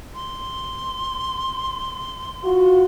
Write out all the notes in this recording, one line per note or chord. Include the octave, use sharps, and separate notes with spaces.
C6
F4 F#4